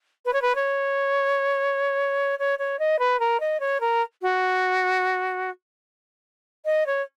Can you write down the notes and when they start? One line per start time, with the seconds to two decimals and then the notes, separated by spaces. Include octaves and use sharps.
0.25 B4
0.33 C#5
0.42 B4
0.55 C#5
2.39 C#5
2.59 C#5
2.79 D#5
2.99 B4
3.20 A#4
3.40 D#5
3.60 C#5
3.81 A#4
4.22 F#4
6.65 D#5
6.86 C#5